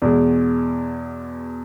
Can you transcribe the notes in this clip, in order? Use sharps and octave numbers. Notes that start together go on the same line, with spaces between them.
E2 B2 G#3